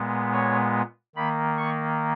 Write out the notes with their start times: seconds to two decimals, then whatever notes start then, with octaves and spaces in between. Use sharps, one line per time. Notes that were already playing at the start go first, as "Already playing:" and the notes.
Already playing: A#2 G#3 B3
0.32 C#5
1.16 D#3 A#3 B5
1.57 C#6